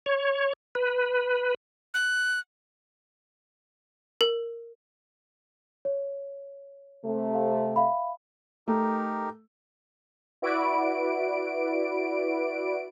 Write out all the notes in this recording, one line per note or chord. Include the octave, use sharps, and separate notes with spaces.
C#5
B4
F#6
A#4
C#5
C3 A3
F5
E5 F5 B5
A3 D#4 G4 A#4
E4 F#4 B4 D5 D7